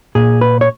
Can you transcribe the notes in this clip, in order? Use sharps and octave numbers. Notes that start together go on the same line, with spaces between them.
A#2 G#4
B4
C#5